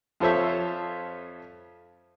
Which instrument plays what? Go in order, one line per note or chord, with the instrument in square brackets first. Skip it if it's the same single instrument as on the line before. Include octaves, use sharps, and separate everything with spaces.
[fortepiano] F2 F4 A4 C5 C#5 E5